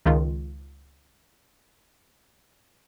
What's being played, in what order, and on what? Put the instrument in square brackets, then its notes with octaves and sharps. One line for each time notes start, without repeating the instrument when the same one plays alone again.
[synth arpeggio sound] C#2 D#3 F4